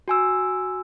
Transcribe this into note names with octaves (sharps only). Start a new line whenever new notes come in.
F#4 G#5 E6